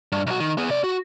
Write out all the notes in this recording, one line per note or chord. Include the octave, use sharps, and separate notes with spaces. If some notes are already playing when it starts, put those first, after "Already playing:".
G2
B1 F#4
D#3
B3 G#4
C3 D5
F#4